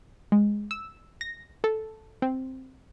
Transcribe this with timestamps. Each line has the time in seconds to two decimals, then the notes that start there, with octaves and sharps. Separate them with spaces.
0.32 G#3
0.71 E6
1.21 A#6
1.64 A4
2.22 C4